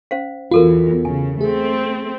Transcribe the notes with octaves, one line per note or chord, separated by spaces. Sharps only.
C#4 C5 F5
E2 F4 F#4 A4 A#4
C#3 G#5
A3 C4 G#4